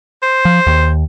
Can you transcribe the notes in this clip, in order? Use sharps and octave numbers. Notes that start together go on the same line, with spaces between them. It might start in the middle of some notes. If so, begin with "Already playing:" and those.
C5
F3
D#2